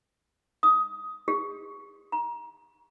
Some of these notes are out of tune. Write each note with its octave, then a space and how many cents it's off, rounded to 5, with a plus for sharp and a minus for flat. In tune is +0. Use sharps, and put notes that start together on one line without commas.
D#6 +15
G#4 -40
A#5 +30